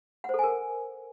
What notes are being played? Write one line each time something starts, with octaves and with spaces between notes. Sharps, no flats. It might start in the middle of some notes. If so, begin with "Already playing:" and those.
A4 A#4 C5 F#5 G#5